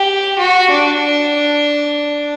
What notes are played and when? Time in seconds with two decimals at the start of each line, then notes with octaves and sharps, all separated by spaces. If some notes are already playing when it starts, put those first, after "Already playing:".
Already playing: G4
0.38 F#4
0.71 D4